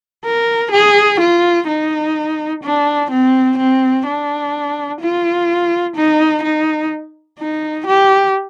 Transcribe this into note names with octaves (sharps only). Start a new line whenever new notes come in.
A#4
G#4
F4
D#4
D4
C4
C4
D4
F4
D#4
D#4
D#4
G4